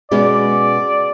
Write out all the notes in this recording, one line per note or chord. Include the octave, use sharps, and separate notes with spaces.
B2 G#3 C#4 D5